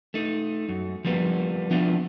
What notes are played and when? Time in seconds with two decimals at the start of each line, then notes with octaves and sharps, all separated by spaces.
0.14 A3 D#4
0.69 F#2
1.05 F3 G3 A#3 B3
1.71 F3 B3 D4 E4 F4